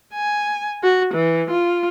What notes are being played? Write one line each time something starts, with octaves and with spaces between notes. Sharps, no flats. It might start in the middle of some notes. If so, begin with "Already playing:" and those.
G#5
F#4
E3
F4